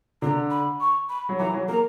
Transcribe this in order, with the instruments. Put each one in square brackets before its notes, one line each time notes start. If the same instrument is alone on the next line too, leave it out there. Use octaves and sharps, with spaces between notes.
[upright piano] D3 [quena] A#5
[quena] B5
C#6
B5
[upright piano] F#3
[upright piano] E3 [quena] A#5
[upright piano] F#3
[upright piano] A#3 [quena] A#5